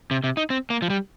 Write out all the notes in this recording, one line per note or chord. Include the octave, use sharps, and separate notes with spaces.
C3
C3
D#4
C4
A#3
F3
G3